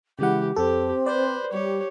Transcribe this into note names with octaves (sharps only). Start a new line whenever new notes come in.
C#3 E3 G#3 G4 F#5
F2 C4 G4 A4
B4 C5 D5
G3 G4 C#5